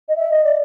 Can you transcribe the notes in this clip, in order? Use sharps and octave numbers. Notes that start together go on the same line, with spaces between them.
D#5
E5
D#5
D5